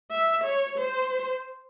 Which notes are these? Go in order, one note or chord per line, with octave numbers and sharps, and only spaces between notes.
E5
C#5
C5